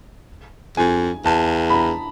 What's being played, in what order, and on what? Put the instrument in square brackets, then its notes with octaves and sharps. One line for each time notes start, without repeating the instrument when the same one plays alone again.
[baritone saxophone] F2 [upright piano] G#5
[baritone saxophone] E2 [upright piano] A5
[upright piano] B5
A#5